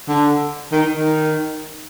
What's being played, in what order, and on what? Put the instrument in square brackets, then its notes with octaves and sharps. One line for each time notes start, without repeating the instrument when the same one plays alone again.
[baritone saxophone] D3
D#3
D#3